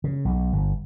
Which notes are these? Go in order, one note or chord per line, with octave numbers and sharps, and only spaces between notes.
C#3
B1
G1